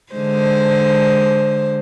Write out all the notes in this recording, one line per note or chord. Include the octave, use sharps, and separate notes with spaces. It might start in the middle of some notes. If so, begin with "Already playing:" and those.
D3 G#3 C5